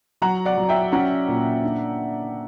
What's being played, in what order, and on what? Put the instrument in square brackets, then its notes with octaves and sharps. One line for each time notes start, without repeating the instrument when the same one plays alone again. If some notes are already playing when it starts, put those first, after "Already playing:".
[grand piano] F#3 [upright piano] F#5 A#5
[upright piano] D5 F#5
[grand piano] F#3
[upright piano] E5 G5
[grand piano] C#4 [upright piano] F#5 A#5
[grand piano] A#2
D4